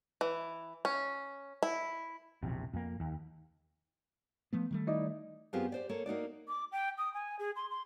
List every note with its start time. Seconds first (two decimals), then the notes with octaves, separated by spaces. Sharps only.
0.21 E3
0.85 C#4
1.63 E4
2.43 E1 A#1 C3
2.73 F2 A#3
3.00 D#2
4.53 F3 A3 B3
4.71 D#3 G3 A3
4.87 D#4 E4 D5
5.53 F#2 B3 C4 F4 G4 G#4
5.72 G4 C5 D5
5.89 A#3 A4 C#5
6.06 A#3 D#4 F#4 D5
6.48 D6
6.72 G5
6.98 D#6
7.14 G#5
7.39 G#4
7.56 C6
7.70 C6